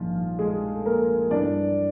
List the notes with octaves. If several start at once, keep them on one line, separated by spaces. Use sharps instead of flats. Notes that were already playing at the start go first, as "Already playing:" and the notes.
Already playing: A#1 G#2 D#3 F3 G3 F4
G#3 G#4
A4
A#3 A#4
G2 E3 G3 D4 D5